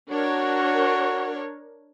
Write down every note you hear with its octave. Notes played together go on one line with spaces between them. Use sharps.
D4 F#4 A#4 C#5